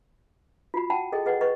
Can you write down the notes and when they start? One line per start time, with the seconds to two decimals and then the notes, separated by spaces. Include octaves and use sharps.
0.74 F4 F#4 B5
0.90 F#5 G5 A5 B5
1.12 G#4 A4 D#5 G5
1.26 G#4 B4 D#5 F#5
1.41 B4 D#5 C#6